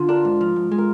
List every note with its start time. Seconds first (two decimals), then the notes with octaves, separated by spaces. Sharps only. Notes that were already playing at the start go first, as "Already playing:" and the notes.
Already playing: D3 F4
0.09 D4 A#4
0.25 G#2
0.41 F3
0.56 G#2
0.72 G#3
0.78 A#4